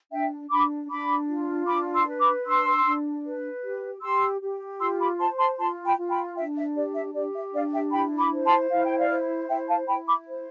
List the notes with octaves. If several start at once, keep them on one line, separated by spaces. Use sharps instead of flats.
D4 E5 G5
D4 B5 D6
D4 B5 D6
F4
D4 B5 D6
C6 E6
B4
B5 D6
D4 C6 E6
D4
B4
G4
G4 C6 E6
G4
F4 C6 E6
B5 D6
C5 A5 C6
A5 C6
F4 A5 C6
G5 B5
F4
G5 B5
D4 E5 G5
E5
G4 D5
E5
G4 D5
E5
D4 D5 F5
E5 G5
E4 G5 B5
B5 D6
C5
A5 C6
E4 F5
G5
D5 F5
C5
E4 E5 G5
F5 A5
E4 G5 B5
B5 D6
C5